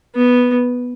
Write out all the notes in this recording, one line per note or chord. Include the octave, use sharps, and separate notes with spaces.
B3